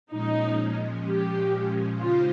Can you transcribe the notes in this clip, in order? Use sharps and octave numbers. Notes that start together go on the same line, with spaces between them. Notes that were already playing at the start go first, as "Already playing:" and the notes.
A#2 F3 G#3 C#4 D#4
G4
C#3 G#3 D#4 F4 G4 C5